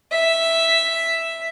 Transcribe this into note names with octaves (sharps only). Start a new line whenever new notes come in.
E5